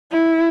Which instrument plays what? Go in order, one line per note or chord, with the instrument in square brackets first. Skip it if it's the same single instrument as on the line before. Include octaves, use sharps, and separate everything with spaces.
[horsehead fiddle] E4